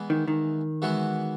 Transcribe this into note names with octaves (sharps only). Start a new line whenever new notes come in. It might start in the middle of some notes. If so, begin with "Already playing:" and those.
Already playing: E3 G#3 B3
D#3
D#3
E3 G#3 B3 F#4